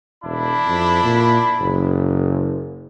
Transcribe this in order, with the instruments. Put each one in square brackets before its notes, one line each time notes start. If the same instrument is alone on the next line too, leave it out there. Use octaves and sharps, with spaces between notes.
[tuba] E1 [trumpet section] D4 E4 B5
[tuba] F2
A#2
F#1